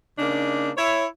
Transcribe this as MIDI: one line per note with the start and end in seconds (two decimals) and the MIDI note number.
0.18 0.70 49
0.18 0.70 58
0.18 0.70 62
0.18 0.70 63
0.77 1.06 64
0.77 1.06 73